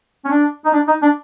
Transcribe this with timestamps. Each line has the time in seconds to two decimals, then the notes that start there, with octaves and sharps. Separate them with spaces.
0.25 C#4
0.31 D4
0.65 D#4
0.73 D4
0.88 D#4
1.02 D4